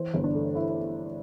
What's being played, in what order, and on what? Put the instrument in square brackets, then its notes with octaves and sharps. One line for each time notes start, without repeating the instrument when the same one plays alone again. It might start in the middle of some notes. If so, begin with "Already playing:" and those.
Already playing: [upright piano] E3 C5
G1
D4
A3
A3 E4